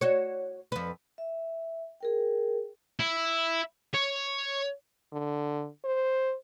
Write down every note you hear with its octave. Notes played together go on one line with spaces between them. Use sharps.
F#4 C#5
F2 B4
E5
G#4 A#4 G5
E4
C#5
D3
C5